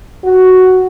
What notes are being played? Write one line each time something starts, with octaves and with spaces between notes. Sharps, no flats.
F#4